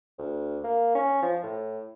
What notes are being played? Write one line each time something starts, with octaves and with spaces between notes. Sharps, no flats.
D2
A#3
C#4
F3
A2